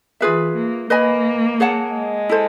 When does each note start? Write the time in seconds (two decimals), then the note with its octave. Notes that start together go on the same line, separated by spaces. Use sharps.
0.20 E3 F4 G#4 B4 E5
0.55 A#3
0.90 A#3 B4 D#5 G#5 B5
1.60 G#4 C#5 F#5 A5
1.94 G#3
2.29 E4 A4 C5